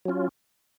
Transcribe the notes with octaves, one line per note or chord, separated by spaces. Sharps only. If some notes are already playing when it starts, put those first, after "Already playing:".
F#3 C#4 F4